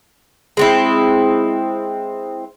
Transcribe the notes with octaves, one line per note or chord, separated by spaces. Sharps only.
G#3 C4 E4